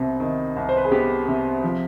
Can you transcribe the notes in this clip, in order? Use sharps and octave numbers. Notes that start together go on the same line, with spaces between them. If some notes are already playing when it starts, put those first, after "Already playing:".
Already playing: C2 C3 B3
D#3
C2
C5
B4
G#4
B3 G4
C3
F3